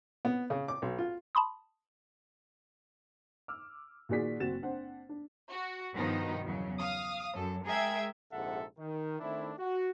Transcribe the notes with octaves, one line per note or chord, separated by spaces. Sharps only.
B3
C#3
D6
B1
F4
A5 B5 C6 D#6
D6 E6 F6
A#2 D#3 F#4 G#4 D5 B6
F#1 C4 F#4 A6 E7
C4 D4 C5 F#5
D4
F#4
G2 B2 D#3 F3 D#4
E2 C#3 F#3
F5 D#6
F#2 A4
G#3 G#4 A#4 E5 G5 G#6
A#1 G#2 C3 A4 E5 F#5
D#3
D#3 A3 C4 D4 E4
F#4